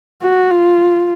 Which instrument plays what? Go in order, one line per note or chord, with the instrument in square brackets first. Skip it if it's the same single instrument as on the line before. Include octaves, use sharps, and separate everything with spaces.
[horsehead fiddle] F#4
F4